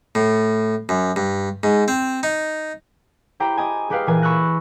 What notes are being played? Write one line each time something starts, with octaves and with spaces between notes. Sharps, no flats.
A2
F#2
G2
G#2
C4
D#4
E4 G4 C5 G5 A#5 B5
G4 D#5 G#5
G#3 G4 B4 F5 G5
A#2 E3 G#5
B5 C#6 E6 F#6 A#6